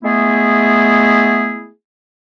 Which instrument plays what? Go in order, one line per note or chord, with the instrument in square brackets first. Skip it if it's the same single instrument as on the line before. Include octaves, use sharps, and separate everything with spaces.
[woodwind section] G#3 A3 B3 E4 G#4